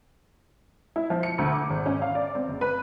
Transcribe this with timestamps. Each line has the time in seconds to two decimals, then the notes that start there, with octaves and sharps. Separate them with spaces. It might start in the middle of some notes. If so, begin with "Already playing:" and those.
0.96 E4
1.10 F3
1.23 C#7
1.38 D2
1.53 D6
1.70 G#1
1.86 C#4
2.02 F5
2.15 D5
2.35 C4
2.49 F#1
2.61 B4